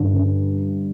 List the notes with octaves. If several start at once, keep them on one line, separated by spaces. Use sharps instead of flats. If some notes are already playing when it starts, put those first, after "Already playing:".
Already playing: G2 D3
D3